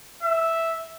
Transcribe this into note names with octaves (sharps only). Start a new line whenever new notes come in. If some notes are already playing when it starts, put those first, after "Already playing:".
E5